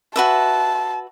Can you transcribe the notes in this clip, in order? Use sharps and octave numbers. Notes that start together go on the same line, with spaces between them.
F#4 B4 E5 A5